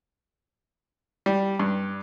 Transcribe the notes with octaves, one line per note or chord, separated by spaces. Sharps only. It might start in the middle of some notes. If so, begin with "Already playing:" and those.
G3
G2